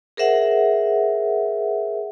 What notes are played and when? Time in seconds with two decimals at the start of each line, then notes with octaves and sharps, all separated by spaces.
0.17 G#4 A#4 C5 E5 F#5